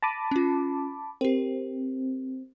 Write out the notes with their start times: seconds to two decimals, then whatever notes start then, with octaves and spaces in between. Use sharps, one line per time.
0.03 A5 B5 D6 A#6 D#7
0.31 C#4 F4
1.21 C4 G4 A#4